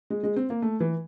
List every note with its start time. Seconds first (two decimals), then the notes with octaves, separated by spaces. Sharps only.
0.10 G#3
0.23 G#3
0.36 C4
0.50 A#3
0.62 A3
0.80 E3